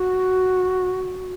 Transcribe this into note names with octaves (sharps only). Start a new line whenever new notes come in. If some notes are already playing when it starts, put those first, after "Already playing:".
Already playing: F#4